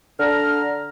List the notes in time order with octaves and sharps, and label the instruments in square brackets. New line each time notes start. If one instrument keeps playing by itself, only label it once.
[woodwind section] D3 A#5 F6